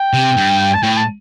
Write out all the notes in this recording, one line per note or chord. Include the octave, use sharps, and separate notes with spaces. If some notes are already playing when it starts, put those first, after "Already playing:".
Already playing: G5
C3
G2
A5
A2 G5
A5